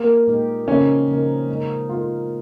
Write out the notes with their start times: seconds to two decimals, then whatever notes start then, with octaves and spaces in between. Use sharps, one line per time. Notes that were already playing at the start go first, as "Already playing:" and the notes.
Already playing: A#3 G4 A#4
0.27 A#2 G#3 D#4 G4 A#4
0.67 C#3 F3 A#3 C#4 D#4 A#4
1.08 C#3 F3 A#3 D#4 A#4
1.48 G#3 D#4 A#4
1.89 G#3 D#4 F4 A#4